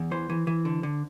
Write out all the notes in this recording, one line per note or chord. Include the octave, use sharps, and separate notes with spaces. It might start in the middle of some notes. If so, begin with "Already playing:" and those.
Already playing: E2
E3 C5
E3
E3
D3
D3